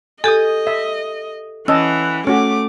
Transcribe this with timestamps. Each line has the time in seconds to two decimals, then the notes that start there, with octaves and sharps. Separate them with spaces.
0.24 G4 A4 D#5 G#5 D#6
0.67 E5
1.68 E3 C#4 D#5 F#5 A5 E6
2.27 A3 C#4 F#4 D6